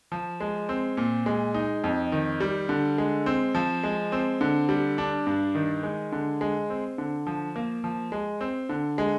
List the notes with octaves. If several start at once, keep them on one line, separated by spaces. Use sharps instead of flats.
F3
G#3
C4
A#2
G#3
D#4
F2
D#3
G3
D3
G#3
C4
F3
G#3
C4
D3
G3
D4
G2
D#3
G#3
D3
G#3
C4
D3
F3
A#3
F3
G#3
C4
D3
G#3